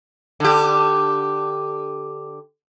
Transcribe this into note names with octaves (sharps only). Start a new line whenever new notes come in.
D3 G4